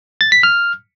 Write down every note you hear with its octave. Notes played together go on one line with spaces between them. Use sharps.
A6
B6
F6